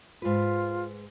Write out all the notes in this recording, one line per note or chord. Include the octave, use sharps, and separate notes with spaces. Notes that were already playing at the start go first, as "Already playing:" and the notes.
G#2 F4 B4